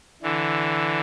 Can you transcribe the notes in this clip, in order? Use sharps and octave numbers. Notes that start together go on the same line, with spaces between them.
D3 E3